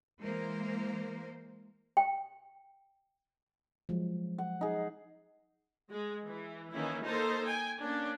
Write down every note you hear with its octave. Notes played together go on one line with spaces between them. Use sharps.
E3 G#3 A#3 A#4 C5
G5
F3 F#3 G#3
F#5
D#4 G#4
G#3
E3
D#3 E3 A#3 C#4 E4
A#3 D#4 A4 A#4 C5 A5
G5 G#5
A#3 C#4 D4